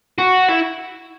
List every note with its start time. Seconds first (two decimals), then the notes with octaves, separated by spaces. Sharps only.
0.18 F#4
0.49 E4